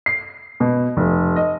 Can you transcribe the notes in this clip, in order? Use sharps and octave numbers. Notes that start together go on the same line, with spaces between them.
C7
B2
F1
D#5